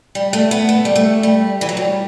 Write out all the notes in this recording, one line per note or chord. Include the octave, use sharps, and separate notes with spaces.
G3
A3
B3
A3
G3
A3
G3
E3
F#3
G3